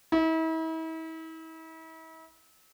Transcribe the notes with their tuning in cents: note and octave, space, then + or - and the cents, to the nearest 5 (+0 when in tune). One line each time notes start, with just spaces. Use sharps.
E4 -40